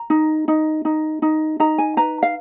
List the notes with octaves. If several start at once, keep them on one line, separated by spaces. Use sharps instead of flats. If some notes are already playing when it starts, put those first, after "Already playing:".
Already playing: A#5
D#4
D#4
D#4
D#4
D#4 A#5
G#5
B4 A#5
F5